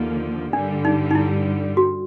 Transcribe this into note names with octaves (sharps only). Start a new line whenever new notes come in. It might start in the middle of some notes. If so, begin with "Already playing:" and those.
Already playing: D#2 D3 F3 A#3
G2 D3 G3 D4
D#4
D#4
E4
F#4